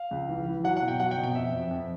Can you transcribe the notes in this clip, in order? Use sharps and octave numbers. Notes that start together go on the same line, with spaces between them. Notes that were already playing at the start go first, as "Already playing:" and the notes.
Already playing: F5
C#2
E3
E3
F#3 F#5
F#5
B2
G5
F#3 F#5
G5
B2
G5
F2 E5
F2
F2